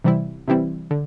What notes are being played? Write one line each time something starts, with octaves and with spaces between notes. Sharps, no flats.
C3 E3 G3 C4 E4
C3 E3 G3 C4 E4
D3